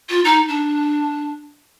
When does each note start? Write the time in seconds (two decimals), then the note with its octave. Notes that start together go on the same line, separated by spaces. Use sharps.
0.09 F4
0.24 D#4
0.48 D4